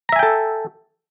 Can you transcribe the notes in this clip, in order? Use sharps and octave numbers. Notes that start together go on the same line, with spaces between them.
A4 E5 G5 G#5 A#5